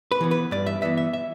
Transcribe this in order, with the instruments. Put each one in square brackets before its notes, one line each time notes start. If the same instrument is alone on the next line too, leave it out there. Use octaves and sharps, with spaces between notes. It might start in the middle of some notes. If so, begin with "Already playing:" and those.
[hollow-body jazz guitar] B4
E3 B3
B4
G2 D5
E5
E3 B3 E5
E5
E5